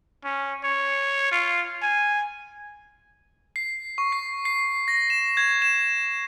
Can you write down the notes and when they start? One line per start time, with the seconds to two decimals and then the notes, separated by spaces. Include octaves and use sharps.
0.24 C#4
0.64 C#5
1.32 F4
1.83 G#5
3.56 C7
3.98 C#6
4.12 C7
4.45 C7
4.88 A#6
5.10 E7
5.37 G#6
5.62 E7